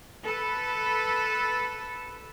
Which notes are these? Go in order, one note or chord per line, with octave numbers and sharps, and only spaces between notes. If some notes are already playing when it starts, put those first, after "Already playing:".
A4 B4